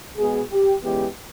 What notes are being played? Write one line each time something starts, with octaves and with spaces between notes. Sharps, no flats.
B2 G#3 B3 G#4
G4
E2 C#3 E3 G#3 B3 G4